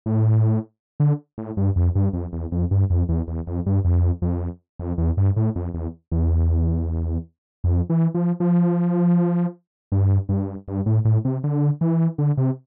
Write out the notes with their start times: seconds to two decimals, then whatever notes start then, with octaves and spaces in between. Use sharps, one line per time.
0.06 A2
1.00 D3
1.38 A2
1.57 G2
1.76 F2
1.95 G2
2.13 F2
2.33 E2
2.52 F2
2.71 G2
2.90 F2
3.09 E2
3.28 E2
3.47 F2
3.66 G2
3.85 F2
4.22 F2
4.79 F2
4.98 E2
5.17 G2
5.36 A2
5.56 F2
5.74 E2
6.12 E2
7.64 F2
7.90 E3
8.14 F3
8.40 F3
9.92 G2
10.29 G2
10.68 G2
10.86 A2
11.05 A2
11.25 C3
11.44 D3
11.81 E3
12.18 D3
12.37 C3